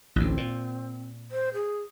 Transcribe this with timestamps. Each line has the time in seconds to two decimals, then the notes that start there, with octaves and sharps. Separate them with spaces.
0.16 A1 D2 C4
0.37 A#2
1.31 C5
1.54 G#4